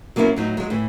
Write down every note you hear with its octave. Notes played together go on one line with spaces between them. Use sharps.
F#3 A#3 B3 C#4 E4
A2 F#3 D#4
F#3 G#3
A2 E3